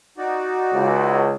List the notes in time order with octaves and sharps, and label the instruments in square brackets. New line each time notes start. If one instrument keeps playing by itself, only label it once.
[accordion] D#4 F#4 D5
[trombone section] C#2